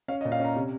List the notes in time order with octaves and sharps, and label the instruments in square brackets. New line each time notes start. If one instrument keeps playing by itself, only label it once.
[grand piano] C#4 F5
D#5
A#2
F5
C#4 A#5
C3